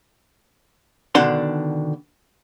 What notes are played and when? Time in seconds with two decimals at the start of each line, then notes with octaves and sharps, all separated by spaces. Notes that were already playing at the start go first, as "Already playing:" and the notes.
1.15 B2 D3 D#3 D4 F#5 C6